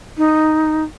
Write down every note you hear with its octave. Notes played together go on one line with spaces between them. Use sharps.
D#4